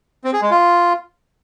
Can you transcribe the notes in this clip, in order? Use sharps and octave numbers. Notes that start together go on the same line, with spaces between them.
C4
G#4
G#3
F4